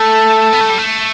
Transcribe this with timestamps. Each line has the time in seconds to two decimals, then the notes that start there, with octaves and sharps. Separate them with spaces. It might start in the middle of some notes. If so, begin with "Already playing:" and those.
Already playing: A3 A4
0.53 B3
0.61 A3
0.70 G3
0.78 A3